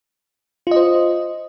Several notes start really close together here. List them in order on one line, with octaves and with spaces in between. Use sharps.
F4 D#5 C5